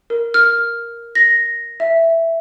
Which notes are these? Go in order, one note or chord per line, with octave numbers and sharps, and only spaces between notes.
A#4
F6
A#6
E5